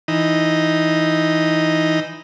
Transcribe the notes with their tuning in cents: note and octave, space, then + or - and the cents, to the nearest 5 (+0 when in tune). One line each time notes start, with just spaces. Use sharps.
E3 +0 D#4 +0